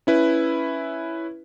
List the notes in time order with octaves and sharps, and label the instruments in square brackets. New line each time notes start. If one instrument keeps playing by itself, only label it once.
[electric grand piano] C#4 E4 B4